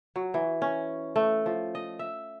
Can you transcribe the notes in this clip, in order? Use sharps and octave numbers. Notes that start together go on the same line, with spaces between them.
F#3
E3
C#4
A3
F3
D#5
E5